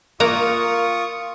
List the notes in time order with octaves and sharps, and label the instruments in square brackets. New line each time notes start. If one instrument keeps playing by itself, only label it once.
[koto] A#3 A#4 A#5 [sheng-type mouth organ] F4 C#6 D#6